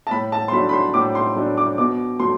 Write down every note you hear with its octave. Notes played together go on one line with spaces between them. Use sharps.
A5
A2 B5
A5
C6
F#3 A3 D4 B5
B5
C6
A2 D6
C6
F#3 A3 D4
D6
B2 D6
F#3 A3 C6